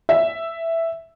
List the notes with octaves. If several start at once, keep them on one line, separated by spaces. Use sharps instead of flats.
E5